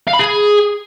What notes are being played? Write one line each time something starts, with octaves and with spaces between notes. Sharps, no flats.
F5
B5
G#4